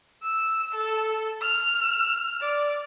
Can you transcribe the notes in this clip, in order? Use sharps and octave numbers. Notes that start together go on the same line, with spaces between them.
E6
A4
F6
D5